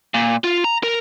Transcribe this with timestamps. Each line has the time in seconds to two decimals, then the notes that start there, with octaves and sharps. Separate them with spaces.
0.14 A#2
0.44 F4
0.65 A#5
0.83 A#4